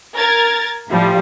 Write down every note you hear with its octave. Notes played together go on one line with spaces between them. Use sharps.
A#4 A#5 G#6 A6
A2 F3 G3